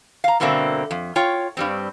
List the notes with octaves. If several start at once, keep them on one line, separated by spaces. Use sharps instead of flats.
F5 A#5
G2 B2 D3 A#3 C4 E5
F2
F4 C#5 G5
G2 G3 C4